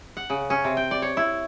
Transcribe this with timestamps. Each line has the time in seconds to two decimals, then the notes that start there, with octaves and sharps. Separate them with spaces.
0.17 F#5
0.30 C#3
0.50 C#4
0.64 C3
0.77 G5
0.91 D5
1.02 C#5
1.17 E4